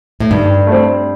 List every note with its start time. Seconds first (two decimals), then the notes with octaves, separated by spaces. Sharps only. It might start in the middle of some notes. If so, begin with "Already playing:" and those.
0.20 A2
0.31 G2 D#3
0.67 A3 C4